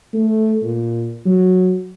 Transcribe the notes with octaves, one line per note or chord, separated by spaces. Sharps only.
A3
A#2
F#3